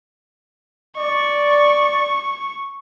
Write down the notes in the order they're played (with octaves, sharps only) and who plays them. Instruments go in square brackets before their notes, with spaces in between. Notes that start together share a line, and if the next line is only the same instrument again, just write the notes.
[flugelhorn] D5 [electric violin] C#6